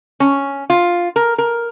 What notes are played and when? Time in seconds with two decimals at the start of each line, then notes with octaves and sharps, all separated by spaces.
0.20 C#4
0.70 F4
1.16 A#4
1.38 A#4